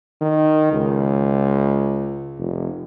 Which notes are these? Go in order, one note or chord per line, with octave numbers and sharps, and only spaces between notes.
D#3
C#2
F1